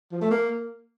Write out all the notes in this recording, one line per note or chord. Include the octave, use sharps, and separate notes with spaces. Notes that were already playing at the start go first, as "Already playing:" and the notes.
F3
A3
A#3